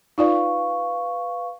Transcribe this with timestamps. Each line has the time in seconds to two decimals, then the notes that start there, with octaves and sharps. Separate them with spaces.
0.18 D#4 F4 B4 D5 F5 C#6